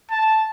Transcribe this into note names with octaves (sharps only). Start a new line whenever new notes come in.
A5